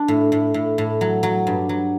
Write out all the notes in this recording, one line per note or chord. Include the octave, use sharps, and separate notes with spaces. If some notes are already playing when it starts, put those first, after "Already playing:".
Already playing: D4
A2
A2
A2
A2
F#3
F#3
G2
F#3